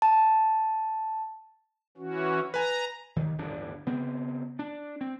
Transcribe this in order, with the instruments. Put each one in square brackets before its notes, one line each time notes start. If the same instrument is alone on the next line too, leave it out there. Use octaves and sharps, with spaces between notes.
[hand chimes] A5
[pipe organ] E3 C#4 F#4
[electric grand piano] B4 G#5 [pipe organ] A#5
[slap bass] D#2 D#3
D1 G1 E3 D4
C#3 B3 C4
D4
C4